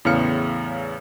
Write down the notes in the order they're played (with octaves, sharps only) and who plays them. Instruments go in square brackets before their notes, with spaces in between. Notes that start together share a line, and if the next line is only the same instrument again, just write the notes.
[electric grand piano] E2 A2 C#3 F5 F6 C#7